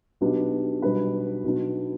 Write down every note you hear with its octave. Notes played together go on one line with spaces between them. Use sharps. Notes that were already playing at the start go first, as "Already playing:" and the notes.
B1 B2 B3 D4 G4
B1 B2 G3 D4 B4
B1 B2 B3 D4